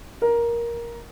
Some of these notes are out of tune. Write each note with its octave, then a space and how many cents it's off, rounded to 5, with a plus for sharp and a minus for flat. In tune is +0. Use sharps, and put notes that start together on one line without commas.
A#4 +10